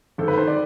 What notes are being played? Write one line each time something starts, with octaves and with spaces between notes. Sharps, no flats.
G#1 A4
B4
D#3 C5
D5